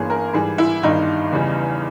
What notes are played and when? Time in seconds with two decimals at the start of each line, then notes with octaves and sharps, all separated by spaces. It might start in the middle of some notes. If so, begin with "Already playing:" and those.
Already playing: G1 G2 E3 A#3 C#4 G#4
0.10 A#4
0.33 G#2 E3 G3 G#4
0.58 E4
0.83 G1 G2 D#3 G3 D#4
1.32 E2 C#3 E3 G3